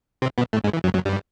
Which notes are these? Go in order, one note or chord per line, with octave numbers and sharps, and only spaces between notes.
C3 C4
B2 B3
A2 A3
G#2 G#3
E3
F#2 F#3
F#2 F#3
G2 G3